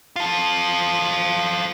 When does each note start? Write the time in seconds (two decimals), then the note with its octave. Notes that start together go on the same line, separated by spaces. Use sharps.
0.16 F4 A4